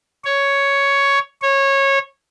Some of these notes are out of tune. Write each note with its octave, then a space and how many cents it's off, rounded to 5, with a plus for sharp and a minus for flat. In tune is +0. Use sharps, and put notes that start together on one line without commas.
C#5 +5
C#5 -20